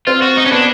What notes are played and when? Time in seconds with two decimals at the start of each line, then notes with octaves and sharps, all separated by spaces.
0.07 C4 F4 C5
0.22 F#4
0.37 D#4
0.46 C#4
0.51 B3 D4 B4